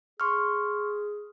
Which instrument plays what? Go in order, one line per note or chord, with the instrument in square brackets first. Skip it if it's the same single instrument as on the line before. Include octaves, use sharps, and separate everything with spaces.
[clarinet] G#4 [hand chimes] C6 C#6 F6